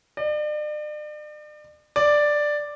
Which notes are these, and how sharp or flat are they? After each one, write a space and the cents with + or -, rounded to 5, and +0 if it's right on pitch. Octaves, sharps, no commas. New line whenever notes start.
D5 +40
D5 +5